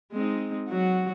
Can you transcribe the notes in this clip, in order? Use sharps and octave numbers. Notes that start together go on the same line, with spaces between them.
G#3 C4 D#4
F#3 F#4